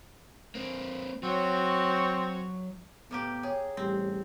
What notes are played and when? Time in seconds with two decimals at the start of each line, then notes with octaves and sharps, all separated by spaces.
0.55 A#3 C4
1.23 F#3 C4 F#4 C#5
3.11 A2 A#3 B3 G4
3.43 G#4 C#5 G5
3.77 A1 G3 C4 G4